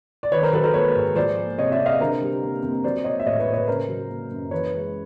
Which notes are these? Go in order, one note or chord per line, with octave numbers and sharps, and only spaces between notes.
D5
D#3 B4 C#5
A#4 C5
F#3 A4 B4
A#4 C5
A#3 B4 C#5
G#2
F3 C5 D5
A#3
C3 C#5 D#5
D5 E5
C3
D#5 F5
D3 A#4 C5
G3
A#3
F2
F#3 C5 D5
A#3 C#5 D#5
E5
A2 C#5 D#5
B4 C#5
A2
B4 C#5
C#3 A#4 C5
F#3
A#3
F#2
E3 B4 C#5
G#3